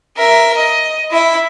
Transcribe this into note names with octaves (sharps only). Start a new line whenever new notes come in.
A#4 E5
D#5
E4 E5